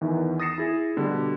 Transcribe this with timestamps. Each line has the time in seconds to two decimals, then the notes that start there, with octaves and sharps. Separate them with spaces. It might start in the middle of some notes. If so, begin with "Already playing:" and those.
0.01 E2 D#3 E3
0.40 D#6 A6 A#6 C7 C#7 E7
0.58 E4 G#4
0.96 B2 D3 G3